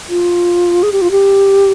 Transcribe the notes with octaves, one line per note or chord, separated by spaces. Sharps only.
F4
G#4
G4
F4
G4